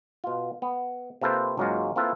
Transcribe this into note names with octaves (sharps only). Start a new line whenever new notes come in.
B2 F4
B3
C3 A#3 F4 A4 B4 C5
C#2 G#2 F#3 G#3 A#3 F4
A#3 C4 E4 F4 A4 B4